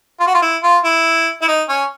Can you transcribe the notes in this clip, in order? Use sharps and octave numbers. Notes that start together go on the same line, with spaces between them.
F4
F#4
F4
E4
F4
E4
E4
D#4
C#4